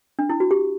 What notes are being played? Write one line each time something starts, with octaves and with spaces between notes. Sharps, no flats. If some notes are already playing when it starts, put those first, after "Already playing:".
D4
E4
F#4
G4